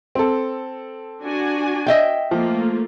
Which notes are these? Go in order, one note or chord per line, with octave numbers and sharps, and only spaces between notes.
C4 A4
D4 F#4 G#5
D#5 E5 G5
F3 A3 A#3 F4